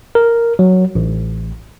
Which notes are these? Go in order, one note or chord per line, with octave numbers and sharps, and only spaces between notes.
A#4
F#3
A1